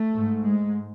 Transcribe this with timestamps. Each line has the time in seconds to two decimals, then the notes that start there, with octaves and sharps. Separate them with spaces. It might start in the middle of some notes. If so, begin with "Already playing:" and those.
Already playing: A3
0.13 G#2
0.44 G#3